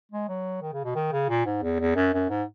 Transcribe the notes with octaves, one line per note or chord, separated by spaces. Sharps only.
G#3
F#3
D#3
C#3
B2
D#3
C#3
A#2
G#2
E2
E2
F#2
F#2
G#2